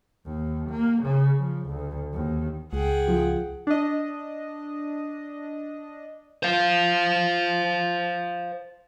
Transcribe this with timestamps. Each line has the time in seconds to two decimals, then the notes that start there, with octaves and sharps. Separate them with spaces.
0.25 D#2
0.70 A#3
1.03 C#3
1.38 F3
1.67 D2
2.13 D#2
2.73 C#2 G#4 F#5 G5
3.08 F3
3.67 D4 D#5
6.43 C5 F5